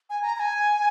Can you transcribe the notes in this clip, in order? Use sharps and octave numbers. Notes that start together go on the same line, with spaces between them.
G#5
A#5
A#5
G#5